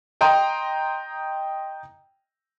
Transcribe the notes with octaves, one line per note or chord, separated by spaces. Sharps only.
D#5 G5 A#5 C6 D#6